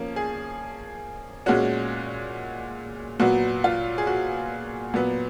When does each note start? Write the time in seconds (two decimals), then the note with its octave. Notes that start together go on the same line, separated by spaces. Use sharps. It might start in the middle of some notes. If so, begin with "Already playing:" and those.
Already playing: F3 A#3 C#4
0.16 G#4
1.46 A#2 G#3 C#4 F#4
3.20 A#2 F#3 B3 F#4
3.64 F4
3.98 G#4
4.07 F#4
4.94 A#2 F#3 B3